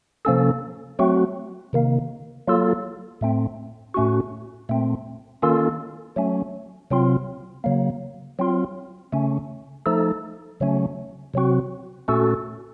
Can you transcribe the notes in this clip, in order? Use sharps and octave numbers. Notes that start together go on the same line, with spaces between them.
C3 F3 A#3 C#4 A4
F#3 A3 C4 F#4
C3 D#3 A#3
F#3 A#3 F4 A4
A2 A3 C4
A2 A3 C#4 F#4
A#2 A3 C4
D#3 A#3 C#4 F4 A4
F#3 A3 C#4
C3 F#3 C4 F4
C#3 F#3 A#3
F#3 C4 F4
C#3 A3 C#4
F3 A3 D#4 A4
C#3 F#3 A3 C#4
C3 F#3 C4 F#4
A#2 A3 C#4 F#4 A4